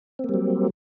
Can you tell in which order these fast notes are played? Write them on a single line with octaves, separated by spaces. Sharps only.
C4 A#3 G3 F#3